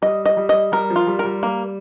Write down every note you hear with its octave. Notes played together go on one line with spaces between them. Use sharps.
G3 D#5
D#5
G3
D#5
G3 A#4
F3
F4
G3
A#4
G3
A#3